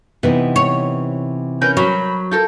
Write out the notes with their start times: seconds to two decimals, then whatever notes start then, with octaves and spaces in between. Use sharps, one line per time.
0.23 C3 E3 B3 D#4
0.56 C#5
1.61 C#4 A#4 B4 G6
1.77 F#3 B5 C6
2.31 F4 A4 A#4 G6